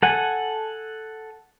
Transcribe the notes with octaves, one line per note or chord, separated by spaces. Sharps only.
A4 F#5 G#5